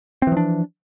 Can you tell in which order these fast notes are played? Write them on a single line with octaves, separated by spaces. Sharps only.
C4 E3 F3 D4